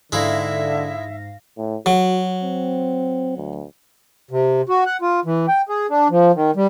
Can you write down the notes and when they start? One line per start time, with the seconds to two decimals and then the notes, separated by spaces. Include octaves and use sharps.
0.12 G#2 D3 G#3 E4 E5 F5 A#6
1.58 A2
1.86 F#3 F#4
2.44 C4
3.37 D2
4.31 C3
4.69 F#4
4.86 F#5
5.02 F4
5.25 E3
5.49 G5
5.69 G#4
5.90 D4
6.10 F3
6.35 D#3
6.56 G3